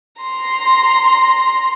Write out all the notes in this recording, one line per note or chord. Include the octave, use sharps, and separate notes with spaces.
A#5 C6